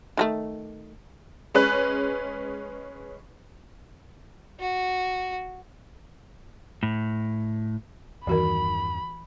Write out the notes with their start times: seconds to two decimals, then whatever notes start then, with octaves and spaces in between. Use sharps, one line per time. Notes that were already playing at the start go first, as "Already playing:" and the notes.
0.17 D#3 G3 A3
1.54 G#3 C#4 B4 F#6
4.60 F#4
6.83 A2
8.27 E2 G2 D#3 E3 F#4 A#4 B5